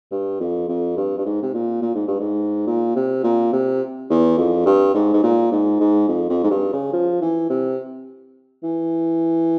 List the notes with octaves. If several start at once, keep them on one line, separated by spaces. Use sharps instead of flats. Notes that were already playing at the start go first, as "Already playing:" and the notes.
G2
F2
F2
G2
G2
G#2
C3
A#2
A#2
G#2
G2
G#2
A#2
C3
A#2
C3
E2
F2
G2
G#2
G#2
A#2
G#2
G#2
F2
F2
G#2
G2
C#3
F3
E3
C3
E3